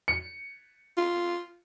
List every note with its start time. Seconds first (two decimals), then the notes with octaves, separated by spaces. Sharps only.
0.08 C#7
0.97 F4